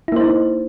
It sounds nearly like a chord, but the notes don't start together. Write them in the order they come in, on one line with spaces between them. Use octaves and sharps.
E4 A#3 C5 D#4